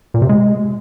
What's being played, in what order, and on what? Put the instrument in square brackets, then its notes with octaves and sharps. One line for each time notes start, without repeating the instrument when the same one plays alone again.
[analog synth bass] A#2
C3
G#3